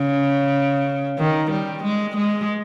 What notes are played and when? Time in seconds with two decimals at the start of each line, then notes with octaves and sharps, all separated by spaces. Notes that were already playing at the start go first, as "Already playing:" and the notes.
Already playing: C#3
1.19 D#3
1.51 G3
1.84 G#3
2.17 G#3